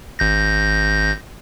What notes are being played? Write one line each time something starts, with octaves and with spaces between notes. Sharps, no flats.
G#1 G6 A#6